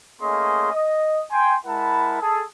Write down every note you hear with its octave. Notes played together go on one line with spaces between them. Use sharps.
A3 A#3 C#4 G#4 D#5 C6
D#5
G5 G#5 C6
G#3 E4 A#4 F#5 A5 B5
G#4 A4 A5